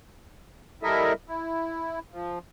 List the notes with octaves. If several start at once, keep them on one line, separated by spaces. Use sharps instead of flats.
G3 E4 A4 A#4 D#5 E5
E4
F3